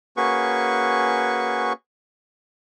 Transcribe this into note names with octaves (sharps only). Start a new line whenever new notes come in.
A#3 C#4 F#4 G#4 B4 C#6